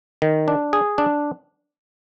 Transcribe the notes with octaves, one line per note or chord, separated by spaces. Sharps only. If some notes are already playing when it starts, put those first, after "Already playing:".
D#3
D4
G#4
D4